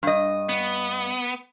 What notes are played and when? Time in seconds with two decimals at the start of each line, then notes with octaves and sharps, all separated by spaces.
0.03 G2 D#5
0.49 B3